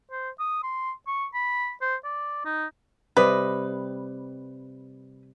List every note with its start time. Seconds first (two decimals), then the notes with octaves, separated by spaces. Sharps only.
0.11 C5
0.40 D#6
0.63 C6
1.07 C#6
1.34 B5
1.82 C5
2.04 D5
2.45 D#4
3.17 C3 G3 B4 D#5